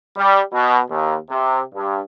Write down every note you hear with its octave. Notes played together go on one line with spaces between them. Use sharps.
G3
B2
D#2
C3
G2